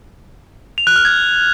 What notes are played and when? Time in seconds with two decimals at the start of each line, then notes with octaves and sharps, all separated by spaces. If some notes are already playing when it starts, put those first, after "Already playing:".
0.78 F7
0.87 F#6
0.96 F6
1.05 G#6